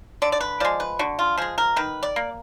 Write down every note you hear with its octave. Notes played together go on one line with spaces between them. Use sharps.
D3 D5
D5
B4
F3 G#3 D5
B4
D3 F#4
F4
F3 G#3 G#4
A#4
D#3 B4
D5
A#3